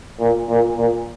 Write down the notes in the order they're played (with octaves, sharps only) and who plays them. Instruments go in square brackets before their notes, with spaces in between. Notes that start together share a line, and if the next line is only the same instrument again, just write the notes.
[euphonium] A#2
A#2
A#2